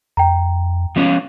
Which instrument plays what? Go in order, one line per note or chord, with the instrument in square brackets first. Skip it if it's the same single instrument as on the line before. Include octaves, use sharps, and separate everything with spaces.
[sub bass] F2 [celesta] G5 A#5
[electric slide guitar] F3 B3 C#4